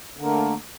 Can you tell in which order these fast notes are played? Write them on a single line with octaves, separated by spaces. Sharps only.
D3 A#3 A3